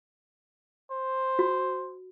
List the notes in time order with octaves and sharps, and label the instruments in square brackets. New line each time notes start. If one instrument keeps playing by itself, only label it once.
[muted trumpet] C5
[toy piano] F#4